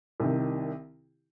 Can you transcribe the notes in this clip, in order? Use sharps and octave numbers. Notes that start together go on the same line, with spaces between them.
C2 C3 D#3